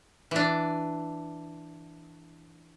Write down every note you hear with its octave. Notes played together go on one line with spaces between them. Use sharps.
E3 D4